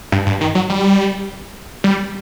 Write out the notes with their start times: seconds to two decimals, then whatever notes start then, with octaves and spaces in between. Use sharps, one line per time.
0.12 G2
0.26 G2
0.41 D#3
0.55 F#3
0.70 G3
1.84 G3